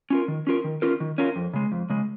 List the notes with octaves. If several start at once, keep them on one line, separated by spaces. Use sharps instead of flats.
C#4 F4 A#4
D#3
C#4 F4 A#4
D#3
C#4 F4 A#4
D#3
C#4 F4 A#4
F2
C#3 G#3
F2
C#3 G#3